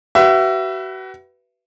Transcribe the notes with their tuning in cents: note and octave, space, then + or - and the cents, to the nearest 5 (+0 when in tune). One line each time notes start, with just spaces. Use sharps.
F#4 +40 B4 +0 E5 +25